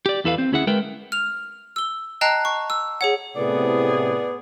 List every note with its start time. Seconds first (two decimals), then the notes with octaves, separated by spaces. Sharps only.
0.06 G4 D5
0.24 E2 E4 A4 B4 F5
0.38 C4
0.52 D2 C#4 E4 G#4 E5 F#5
0.67 G#3 A#4 B4 E5 G5
1.12 F6 F7
1.76 E6 G7
2.21 D#5 G5 A5 A#5 F#6 C7
2.45 C#6
2.70 E6
3.01 G#4 C#5 F#5
3.36 A2 C3 B3 G#4 B4 D5